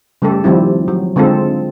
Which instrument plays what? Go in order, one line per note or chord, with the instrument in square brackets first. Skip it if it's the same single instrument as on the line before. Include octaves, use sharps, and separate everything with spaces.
[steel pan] C#3 G3 A3 G4 A4
D#3 F3 G3 C4 E4
F#3
D3 G#3 C4 F4 A4